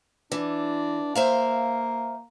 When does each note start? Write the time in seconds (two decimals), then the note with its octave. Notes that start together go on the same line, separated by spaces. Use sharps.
0.32 E3 D4
1.15 A#3 C5 E5 F5